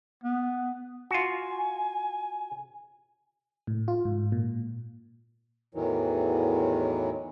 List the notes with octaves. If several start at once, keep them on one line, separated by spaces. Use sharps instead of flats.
B3
F4 F#4 G#5
A2
F4
G#2
A#2
E2 A2 D#3 E3 F#3